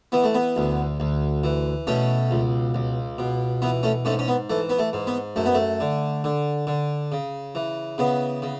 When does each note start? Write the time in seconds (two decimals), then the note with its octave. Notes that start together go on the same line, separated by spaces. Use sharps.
0.12 E3 B3
0.24 A3
0.34 B3
0.56 D2
1.00 D2
1.44 E3
1.87 B2 A3 C#4
2.31 C#2
2.74 C#2
3.18 B2
3.62 E3 B3
3.83 A3 C#4
4.05 G#2 A3 C#4
4.19 C#4
4.28 B3
4.50 E3 A3
4.70 B3
4.79 A3
4.93 G#2
5.07 B3
5.36 F#2 A3
5.46 B3
5.54 A3
5.80 D3
6.24 D3
6.67 D3
7.12 C#3
7.55 E3
7.98 C#3 B3
8.42 C#3